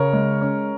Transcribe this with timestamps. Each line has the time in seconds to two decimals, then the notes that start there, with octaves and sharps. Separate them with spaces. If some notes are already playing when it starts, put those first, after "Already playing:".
Already playing: C#3 A#4 C#5
0.13 G#3
0.42 C#4